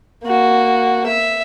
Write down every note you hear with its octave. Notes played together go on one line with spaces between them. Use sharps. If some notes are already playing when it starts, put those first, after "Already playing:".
A#3 F#4
E5